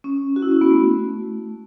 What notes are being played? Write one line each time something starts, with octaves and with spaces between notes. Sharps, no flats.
C#4
F#4
E4
C#4
B3
A3